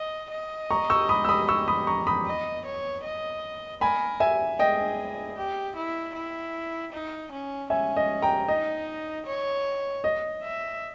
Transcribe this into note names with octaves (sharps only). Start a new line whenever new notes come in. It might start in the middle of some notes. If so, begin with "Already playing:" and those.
Already playing: D#5
D#5
A#5 C#6
C#6 E6
B5 D#6
E6
B5 D#6
C#6 E6
B5 D#6
A#5 C#6
B5 D#6
D#5
C#5
D#5
A#4 G#5 B5
E5 G#5
G#4 D#5 G5
G4
E4
E4
D#4
C#4
C#4 E5 G#5
D#5
G5 A#5
D#4 D#5
C#5
D#5
E5